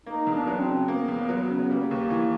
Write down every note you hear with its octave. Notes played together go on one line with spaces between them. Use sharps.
A#3 D#4
E2
D4
F#3
C4
C#3
A#3 B3
E2
F#3
C#3
G3 A#3
D#2
E3